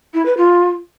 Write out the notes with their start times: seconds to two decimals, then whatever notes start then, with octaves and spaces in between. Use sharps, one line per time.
0.14 E4
0.26 B4
0.37 F4